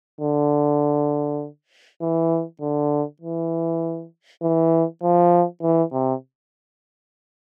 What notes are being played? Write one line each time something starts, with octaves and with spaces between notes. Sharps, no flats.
D3
E3
D3
E3
E3
F3
E3
C3